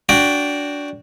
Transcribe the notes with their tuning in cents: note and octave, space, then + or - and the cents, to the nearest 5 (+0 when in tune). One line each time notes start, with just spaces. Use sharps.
D4 -20 F#4 +0 G5 +0